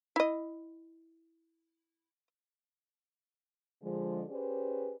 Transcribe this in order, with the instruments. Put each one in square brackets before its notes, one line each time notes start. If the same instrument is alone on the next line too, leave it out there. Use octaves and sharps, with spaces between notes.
[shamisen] E4 D#5
[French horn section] D3 F3 G#3
C#4 G4 G#4 B4 C5 D5